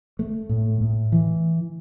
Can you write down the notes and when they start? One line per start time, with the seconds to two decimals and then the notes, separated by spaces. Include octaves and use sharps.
0.19 A3
0.49 A2
0.81 A2
1.12 E3